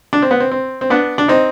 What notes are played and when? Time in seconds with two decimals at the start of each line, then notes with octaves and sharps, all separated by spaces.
0.13 D4
0.22 C4
0.31 B3
0.40 C4
0.51 C4
0.81 C4
0.90 B3 D4
1.18 D4
1.28 C4 D#4